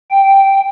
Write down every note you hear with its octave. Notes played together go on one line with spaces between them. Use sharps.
G5